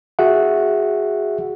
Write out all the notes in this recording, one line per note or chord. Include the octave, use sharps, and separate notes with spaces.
F#4 G#4 E5 F#5